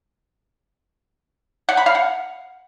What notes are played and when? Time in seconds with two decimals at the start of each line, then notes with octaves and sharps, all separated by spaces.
1.69 F#5
1.77 B5
1.86 F5
1.95 F#5